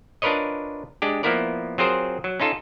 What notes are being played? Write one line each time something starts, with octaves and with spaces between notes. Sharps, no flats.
D4 F4 A#4 B4 C#5 D#5
G#3 D4 G4
F3 A#3 B3 E4 A#4 D5
F#3 C4 F4 G#4 A#4 C5
F#3
C#4 D#4 F4 A4